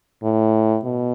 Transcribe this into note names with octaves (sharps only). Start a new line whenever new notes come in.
A2
B2